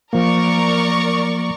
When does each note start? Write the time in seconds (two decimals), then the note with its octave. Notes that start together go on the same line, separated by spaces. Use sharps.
0.13 F3 A#3 A#4 D5 C#6